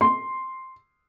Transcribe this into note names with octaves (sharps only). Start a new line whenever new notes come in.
C6